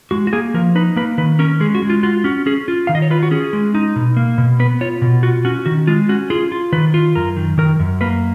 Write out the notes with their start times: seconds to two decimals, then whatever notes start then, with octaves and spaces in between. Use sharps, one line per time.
0.11 G#3 F#4
0.27 F#4
0.33 A#3 G#4
0.54 F3 A#4
0.75 D#4 B4
0.96 A#3 B4
1.18 D#3 B4
1.39 C#4 A#4
1.60 G#3 G#4
1.75 F#4
1.82 G#3
1.89 F4
2.03 F4 F#4
2.24 C#4 F#4
2.46 C#4 G#4
2.68 F4
2.87 D#3 F5
2.95 D#5
3.02 C#5
3.10 F4 B4
3.23 F#4
3.31 C#4 G#4
3.53 G#3
3.75 D#4
3.96 B2
4.17 A#3
4.38 B2
4.59 B3 B4
4.81 F4 C#5
5.02 B2
5.23 F4 F#4
5.45 C#4 F#4
5.66 D#3 F#4
5.87 G#3 F4
6.09 C#4 F#4
6.30 F4 G#4
6.52 F4
6.72 D#3 B4
6.94 F4
7.15 F#2 A#4
7.37 D#3
7.58 D#3 A#4
7.80 F#2
8.01 A#3 B4